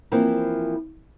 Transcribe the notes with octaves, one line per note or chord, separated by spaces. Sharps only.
E3 F3 A#3 C4 E4